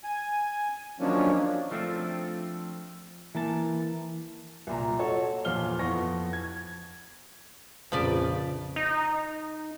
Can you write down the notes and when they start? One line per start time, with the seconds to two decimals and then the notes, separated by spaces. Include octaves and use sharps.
0.04 G#5
1.00 D#3 F3 F#3 A#3 C#4 D4
1.71 F3 A3 C4 D4
3.35 E3 A#3 A5
4.67 C2 A#2 A#5
4.99 F#4 A4 C#5
5.45 E2 A#2 F3 F5 F6 G7
5.79 F2 B3 E4 C#6 A#6
6.33 G#6
7.92 A#1 F2 C#3 F3 B4 D5
8.76 D#4